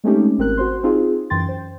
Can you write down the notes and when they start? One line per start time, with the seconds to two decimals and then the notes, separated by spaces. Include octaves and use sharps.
0.04 G#3 A3 C4 C#4 D#4 G4
0.38 G#1 C4 A#4 F#6
0.57 F#4 C5 C6
0.83 C4 D#4 F4 G#4
1.30 F#2 E3 G5 C6 A6
1.49 C5